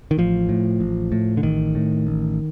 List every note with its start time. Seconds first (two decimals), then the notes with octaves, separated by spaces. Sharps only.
0.11 D#3
0.18 A1 F3
0.49 A2
0.80 A1
1.12 A2
1.37 D3
1.43 A1 D#3
1.75 A2
2.07 A1